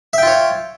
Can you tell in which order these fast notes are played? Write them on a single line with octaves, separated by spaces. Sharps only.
E5 G5 F4 C#5